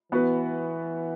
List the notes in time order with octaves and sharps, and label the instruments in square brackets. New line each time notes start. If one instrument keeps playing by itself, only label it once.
[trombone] E3 [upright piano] B3 F#4 B4